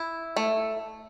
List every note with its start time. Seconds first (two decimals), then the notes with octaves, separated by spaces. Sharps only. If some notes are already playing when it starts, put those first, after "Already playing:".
Already playing: E4
0.36 A3